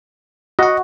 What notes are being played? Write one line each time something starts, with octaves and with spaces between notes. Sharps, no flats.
F#4 D#5 F#5